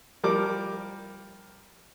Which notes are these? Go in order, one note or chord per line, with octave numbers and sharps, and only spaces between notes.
F3 G3 A#4 D6